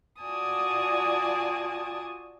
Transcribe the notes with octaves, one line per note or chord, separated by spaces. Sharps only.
F4 F#4 D5 G#5 A5 D#6